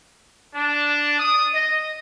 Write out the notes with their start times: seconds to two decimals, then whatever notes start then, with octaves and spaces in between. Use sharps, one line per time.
0.54 D4
1.20 D#6
1.54 D#5